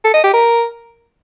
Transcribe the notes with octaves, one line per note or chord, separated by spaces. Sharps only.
A4
D#5
G4
A#4